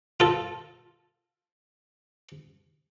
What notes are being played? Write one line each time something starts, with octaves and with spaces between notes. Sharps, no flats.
F4 A4